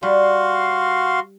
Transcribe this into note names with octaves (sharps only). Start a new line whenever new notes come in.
G3 F#4 F5 C6